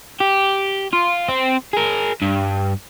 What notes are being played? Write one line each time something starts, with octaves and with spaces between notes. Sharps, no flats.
G4
F4
C4
G#4 A#4
G2